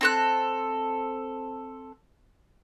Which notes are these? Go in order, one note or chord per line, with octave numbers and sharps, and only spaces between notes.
C4 A4 F#6